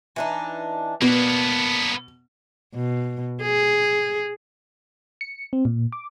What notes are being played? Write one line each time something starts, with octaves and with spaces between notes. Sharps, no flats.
E3 D4 D#4
B2 A#3 B3 D4 B4
B2
G#4
C#7
C4
A#2
D6